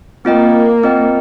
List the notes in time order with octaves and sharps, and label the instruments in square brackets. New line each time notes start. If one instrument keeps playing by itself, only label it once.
[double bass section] A#3 [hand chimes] C4 F4 D#5 G5
[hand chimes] C4 F4 D#5 G5